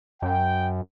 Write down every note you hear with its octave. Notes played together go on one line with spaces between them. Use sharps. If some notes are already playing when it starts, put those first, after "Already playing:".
F#2 G5